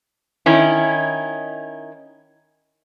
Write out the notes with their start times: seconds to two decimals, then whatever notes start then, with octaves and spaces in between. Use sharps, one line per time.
0.46 D#3 C#4 D#4 E4